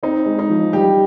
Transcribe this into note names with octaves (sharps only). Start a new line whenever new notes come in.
C4 D#4
G#3
D#4
F3
G3 G4